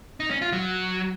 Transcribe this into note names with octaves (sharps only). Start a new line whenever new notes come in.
D#4
C#4
F4
F#3